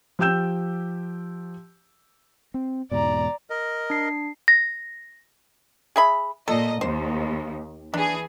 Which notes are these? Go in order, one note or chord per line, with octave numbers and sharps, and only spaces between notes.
F3 G4 G5 E6 G6 E7
C4
E2 G#2 B2 D5 A#5
A#4 D#5
D4 C7
A#6
G#4 E5 B5
A#2 A4 D#5
D#2 C5
E3 D4 G#4